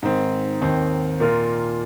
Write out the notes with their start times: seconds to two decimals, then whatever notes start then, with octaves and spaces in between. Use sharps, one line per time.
0.02 G#2 D#3 C4
0.62 D#2 D#3 C4
1.20 A#2 A#3 F4 A#4